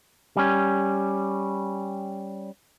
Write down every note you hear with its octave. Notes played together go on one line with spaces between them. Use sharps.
G3 C#4